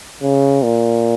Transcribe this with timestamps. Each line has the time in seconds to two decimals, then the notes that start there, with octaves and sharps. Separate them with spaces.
0.22 C#3
0.63 A#2